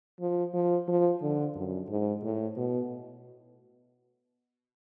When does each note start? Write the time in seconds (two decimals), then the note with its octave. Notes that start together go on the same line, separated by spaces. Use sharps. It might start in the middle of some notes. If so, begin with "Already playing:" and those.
0.20 F3
0.54 F3
0.88 F3
1.22 D3
1.56 F#2
1.89 G#2
2.23 A2
2.57 B2